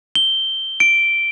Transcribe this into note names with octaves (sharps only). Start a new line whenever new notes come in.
G7
D7